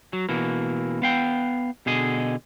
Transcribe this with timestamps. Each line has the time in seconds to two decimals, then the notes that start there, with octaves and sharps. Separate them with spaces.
0.13 F#3
0.29 B2 E3 A#3
1.02 B3 F5 G5
1.86 B2 D3 G#4 D#5